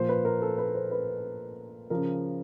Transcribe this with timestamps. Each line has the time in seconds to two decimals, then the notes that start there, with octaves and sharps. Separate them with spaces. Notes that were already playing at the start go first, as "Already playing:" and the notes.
Already playing: A#2 F3 C5
0.09 B4
0.25 A#4
0.42 A4
0.58 B4
0.75 C5
0.91 B4
1.90 C#3 F3 A#4